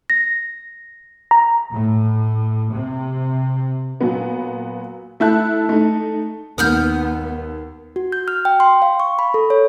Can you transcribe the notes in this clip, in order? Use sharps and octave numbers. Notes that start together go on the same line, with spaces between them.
A#6
A#5
A2
C3
A#2 F#3 B3
A3 E4 A5 F#6
A3 D#4
D#2 B3 D#6 F6 G6
F#4
G6
F6
G5
C6
F5
C#6
B5
A4
C#5